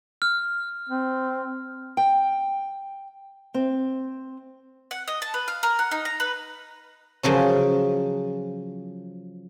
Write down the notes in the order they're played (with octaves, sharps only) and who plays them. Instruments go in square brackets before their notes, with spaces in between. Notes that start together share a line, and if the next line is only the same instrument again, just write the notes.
[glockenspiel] F6
[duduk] C4
[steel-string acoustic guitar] G5
C4
[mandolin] F#5
D#5
A5
B4
F5
A#4
F#5
D#4
A#5
B4
[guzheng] C#3 F3 F#3 C#4